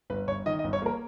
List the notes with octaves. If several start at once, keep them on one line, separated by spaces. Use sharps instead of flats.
G1 B4
G1 C#5
D#3 D#5
D#5
G1
C#5
A#3 A#4